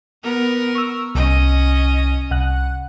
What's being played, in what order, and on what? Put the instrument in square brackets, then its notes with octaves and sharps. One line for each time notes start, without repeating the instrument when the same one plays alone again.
[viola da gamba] B3 A#4
[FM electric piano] C#6 E6
[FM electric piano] C2 [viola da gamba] C#4 D#5
[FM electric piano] C2 F#5 F#6